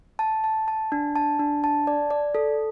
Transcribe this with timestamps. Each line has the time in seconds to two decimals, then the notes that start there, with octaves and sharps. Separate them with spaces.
0.19 A5
0.44 A5
0.68 A5
0.92 D4
1.16 A5
1.39 D4
1.64 A5
1.87 D5
2.10 D5
2.35 A4